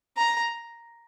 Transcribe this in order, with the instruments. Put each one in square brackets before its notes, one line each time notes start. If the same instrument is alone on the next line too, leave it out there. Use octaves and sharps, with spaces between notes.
[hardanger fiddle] A#5